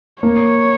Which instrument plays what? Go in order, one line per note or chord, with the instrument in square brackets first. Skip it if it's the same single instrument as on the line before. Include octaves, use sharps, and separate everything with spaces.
[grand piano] A#3 [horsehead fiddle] C#5